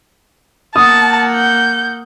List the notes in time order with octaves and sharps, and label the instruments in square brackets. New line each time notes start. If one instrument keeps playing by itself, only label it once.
[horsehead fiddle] A#3 F#5 [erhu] A5 [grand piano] D#6
[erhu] G6